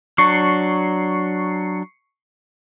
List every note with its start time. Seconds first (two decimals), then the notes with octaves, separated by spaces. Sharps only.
0.18 F#3 D4 C#6 C7 C#7